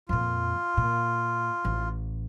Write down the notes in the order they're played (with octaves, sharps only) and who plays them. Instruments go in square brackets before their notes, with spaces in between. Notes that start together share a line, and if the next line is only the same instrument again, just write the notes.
[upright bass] F2 A#2 [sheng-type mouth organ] F4
[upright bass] A#2
A1